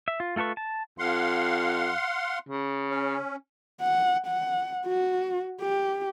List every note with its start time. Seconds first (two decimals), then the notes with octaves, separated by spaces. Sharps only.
0.08 E5
0.20 F4
0.36 A3 F4 A4 B4 C#6
0.57 A5
0.99 F2 F5 F#5 C6
2.49 C#3
2.90 C#4
3.82 F#5
4.27 F#5
4.85 F#4
5.61 G4